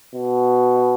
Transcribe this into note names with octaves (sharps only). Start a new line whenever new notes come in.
B2